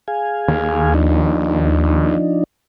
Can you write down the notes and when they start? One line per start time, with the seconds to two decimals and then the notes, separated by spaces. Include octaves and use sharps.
0.08 G#4 F5 G#5
0.48 D#2
0.94 F3 D4 D#4